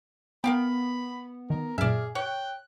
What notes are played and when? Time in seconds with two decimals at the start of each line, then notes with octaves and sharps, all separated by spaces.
0.44 B3 A#4 F5 G5 B5
1.50 D#3 A#4
1.78 F#2 A#2 G#4 D5 E5 F6
2.15 C#5 G5 F#6